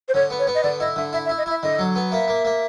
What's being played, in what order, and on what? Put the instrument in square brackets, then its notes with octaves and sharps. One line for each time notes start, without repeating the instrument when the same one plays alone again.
[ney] C5
[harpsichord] D3 [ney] C#5
[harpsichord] B3
[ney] C#5
[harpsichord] B3
[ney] D#5
[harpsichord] D3 [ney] D5
[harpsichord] E4 [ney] D#5
[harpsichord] D3 [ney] E5
[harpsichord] E4 [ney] E5
[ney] E5
[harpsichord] E4
[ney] D#5
[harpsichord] E4 [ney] E5
[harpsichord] D3 [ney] D#5
[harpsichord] F#3
B3
[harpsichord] A#3 [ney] E5
[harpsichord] A#3
A#3